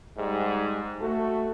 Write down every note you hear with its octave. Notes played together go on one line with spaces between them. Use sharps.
G#2 G3
A3 F#4 A4